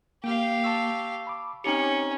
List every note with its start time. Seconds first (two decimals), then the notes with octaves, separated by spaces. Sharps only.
0.24 A#3 G4 F5 G5
0.64 A5 C#6 E6
1.27 B5 D6
1.64 C4 C#4 D#4 G4 C#7